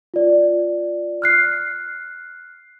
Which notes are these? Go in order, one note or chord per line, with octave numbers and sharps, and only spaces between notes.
F4 D5
F6 F#6 C7